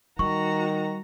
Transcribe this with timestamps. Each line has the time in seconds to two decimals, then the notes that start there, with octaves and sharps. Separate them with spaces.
0.19 D#3 G3 F#4 A#5 C#6